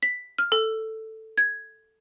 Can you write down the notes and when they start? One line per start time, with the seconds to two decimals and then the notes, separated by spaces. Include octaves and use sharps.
0.03 B6
0.38 F6
0.52 A4
1.38 G#6